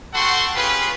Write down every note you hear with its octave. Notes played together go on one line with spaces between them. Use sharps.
F#4 A4 F#5 G5 C6 C#6
C#4 F4 G4 G#4 B4